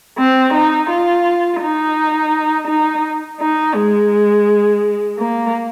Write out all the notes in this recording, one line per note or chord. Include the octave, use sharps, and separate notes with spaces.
C4
D#4
F4
D#4
D#4
D#4
G#3
A#3